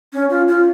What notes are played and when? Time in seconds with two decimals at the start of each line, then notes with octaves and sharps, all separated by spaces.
0.13 C#4
0.30 F4
0.48 F4